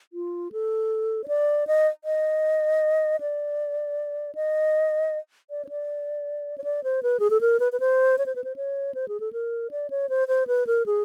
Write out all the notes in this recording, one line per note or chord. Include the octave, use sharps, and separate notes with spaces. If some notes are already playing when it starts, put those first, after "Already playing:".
F4
A4
C#5
D5
D#5
D#5
D5
D#5
D5
C#5
D5
C#5
D5
C5
B4
G#4
A4
A#4
B4
B4
C5
C#5
C5
B4
C5
C#5
C5
G#4
A4
A#4
D5
C#5
C5
C5
B4
A#4
G#4